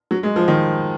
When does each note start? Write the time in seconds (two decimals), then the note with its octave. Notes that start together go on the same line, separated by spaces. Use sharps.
0.11 F#3
0.23 G#3
0.36 F3
0.48 D#3